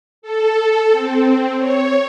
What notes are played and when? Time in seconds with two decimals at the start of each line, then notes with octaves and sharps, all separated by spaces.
0.22 A4
0.91 C4
1.58 C#5